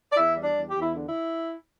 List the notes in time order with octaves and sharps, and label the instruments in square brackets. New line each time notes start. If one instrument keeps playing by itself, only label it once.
[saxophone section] D5
E2 E4 E5
G3
D4 D5
E2
G4
E2
E4
D3
E4